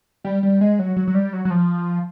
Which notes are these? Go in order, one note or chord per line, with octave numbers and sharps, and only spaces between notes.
G3
G3
G#3
F#3
F#3
F#3
G3
F#3
F#3
F3